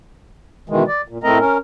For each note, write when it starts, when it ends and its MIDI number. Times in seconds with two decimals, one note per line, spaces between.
0.69 0.83 47
0.69 0.83 51
0.69 0.83 52
0.69 0.83 56
0.88 1.01 74
1.08 1.18 46
1.24 1.38 45
1.24 1.38 57
1.24 1.38 60
1.24 1.38 70
1.24 1.38 75
1.24 1.38 82
1.39 1.58 61
1.39 1.58 70